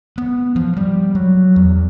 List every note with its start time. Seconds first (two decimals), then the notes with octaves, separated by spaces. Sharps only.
0.18 B3
0.56 F3
0.77 G3
1.15 F#3
1.56 E2